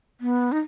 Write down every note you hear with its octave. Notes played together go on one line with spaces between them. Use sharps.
B3
D#4